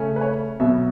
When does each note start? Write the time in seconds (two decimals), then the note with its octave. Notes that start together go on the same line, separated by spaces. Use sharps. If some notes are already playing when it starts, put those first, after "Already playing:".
Already playing: C#3 A3 C#4
0.16 B4
0.21 C#5
0.60 B2 F#3 B3 E5